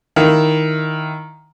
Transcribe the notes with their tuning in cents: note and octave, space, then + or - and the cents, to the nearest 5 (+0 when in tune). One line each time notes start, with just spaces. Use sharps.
D#3 +0 E4 +0 F5 +0